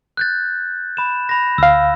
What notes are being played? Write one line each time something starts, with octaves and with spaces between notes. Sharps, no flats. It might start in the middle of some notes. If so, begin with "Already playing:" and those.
F#6 G6 A6
B5 E7
B5 A#6
D2 F5 E6